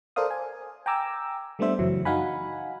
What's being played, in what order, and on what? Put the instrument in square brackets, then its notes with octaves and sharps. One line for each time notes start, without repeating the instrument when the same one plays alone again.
[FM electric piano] A4 A#4 C5 D5 F5 D#6
G#5
G5 G#5 A#5 D6 E6
G3 A3 B3 D4 C5 E5
F#2 C#3 E3 F#3
D#4 F#4 F5 F#5 G#5 B5